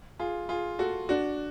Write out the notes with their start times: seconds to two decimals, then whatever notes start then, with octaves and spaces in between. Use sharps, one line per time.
0.19 F4 G#4
0.49 F4 G#4
0.79 F#4 A4
1.09 D4 F#4